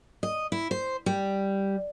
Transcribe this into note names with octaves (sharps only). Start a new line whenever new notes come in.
D#5
E4
C5
G3